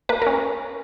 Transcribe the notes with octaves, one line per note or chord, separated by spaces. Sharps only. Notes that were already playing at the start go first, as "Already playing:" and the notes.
A#3 B4
C#4 A#4